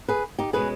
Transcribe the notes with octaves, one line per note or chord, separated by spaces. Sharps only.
G#4 B4
D#4 G4
B2 G#3 C#4 G#4 B4